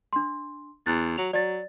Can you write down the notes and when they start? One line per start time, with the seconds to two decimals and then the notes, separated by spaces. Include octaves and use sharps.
0.13 D4 C6
0.86 E2 F#6 A6
1.18 F#3 F7
1.33 F#3 D5 A6